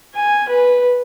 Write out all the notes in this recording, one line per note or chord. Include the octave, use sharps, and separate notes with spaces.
G#5
B4